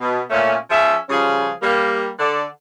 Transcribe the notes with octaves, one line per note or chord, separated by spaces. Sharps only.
B2
A#2 A3 C#4
F3 C#4 G#4 E5
C#3 F3 G3 C#4 F4 G#4
G3 A#3
D3 A4 D5